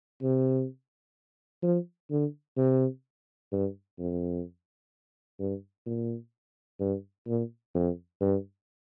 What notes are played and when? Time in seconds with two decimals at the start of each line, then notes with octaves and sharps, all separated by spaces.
0.23 C3
1.63 F3
2.11 D3
2.57 C3
3.52 G2
3.99 F2
5.40 G2
5.86 A#2
6.80 G2
7.27 A#2
7.75 F2
8.21 G2